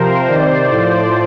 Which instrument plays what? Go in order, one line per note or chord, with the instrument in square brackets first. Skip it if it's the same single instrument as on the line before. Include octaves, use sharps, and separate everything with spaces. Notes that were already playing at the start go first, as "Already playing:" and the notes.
Already playing: [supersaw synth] C3 F3 A#4 C5
C3 D#3 C5 D5
A2 F3